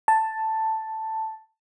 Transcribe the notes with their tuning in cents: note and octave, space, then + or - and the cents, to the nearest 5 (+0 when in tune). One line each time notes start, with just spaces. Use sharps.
A5 +5